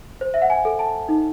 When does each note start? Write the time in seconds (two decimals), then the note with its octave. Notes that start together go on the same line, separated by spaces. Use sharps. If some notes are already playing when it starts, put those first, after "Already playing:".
0.21 C5
0.34 E5
0.42 F#5
0.50 G#5
0.65 A4
0.79 A5
1.09 D#4